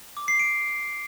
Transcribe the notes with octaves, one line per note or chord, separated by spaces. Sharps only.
D6
C7
D7